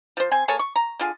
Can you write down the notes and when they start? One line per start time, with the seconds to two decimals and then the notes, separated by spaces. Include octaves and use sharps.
0.17 F3 C5
0.31 C4 G#5 C6
0.48 A#3 G#4 A4 C#5
0.59 C#6
0.76 A#5
1.00 D3 F4 G#4